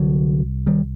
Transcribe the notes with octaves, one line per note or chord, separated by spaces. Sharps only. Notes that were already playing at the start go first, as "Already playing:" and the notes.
Already playing: C2 D3 F#3
D#3 G3